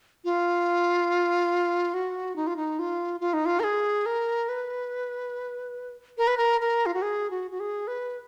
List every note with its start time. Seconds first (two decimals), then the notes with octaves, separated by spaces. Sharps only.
0.24 F4
1.94 F#4
2.36 D#4
2.47 F4
2.56 D#4
2.79 F4
3.20 F4
3.33 D#4
3.45 F4
3.60 A#4
3.64 G#4
4.06 A#4
4.49 B4
6.18 A#4
6.27 B4
6.38 A#4
6.61 A#4
6.86 F4
6.94 F#4
7.02 G#4
7.30 F#4
7.51 F#4
7.60 G#4
7.87 B4